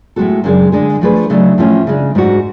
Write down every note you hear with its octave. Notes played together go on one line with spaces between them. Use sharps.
A2 G#3 B3 F#4 A4
F#2 C#3 G#3 D4 G#4
D3 G#3 D4 G#4
F3 A3 D4 G#4 B4
C#3 F#3 A3 D4
A2 F3 A3 C#4
C#3 G#3 D4
G#2 G#3 D4 F#4